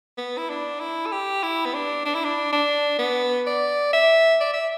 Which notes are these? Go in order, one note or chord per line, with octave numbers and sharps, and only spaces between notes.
B3
E4
D4
E4
A4
G4
E4
B3
D4
D4
E4
D4
D4
B3
D5
E5
D5
E5